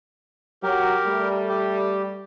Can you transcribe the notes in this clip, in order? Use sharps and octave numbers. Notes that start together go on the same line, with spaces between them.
F#3 G4 A#4
G3 A3
G4